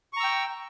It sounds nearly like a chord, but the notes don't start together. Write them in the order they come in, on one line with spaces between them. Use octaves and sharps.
C#6 A#5 E6 G5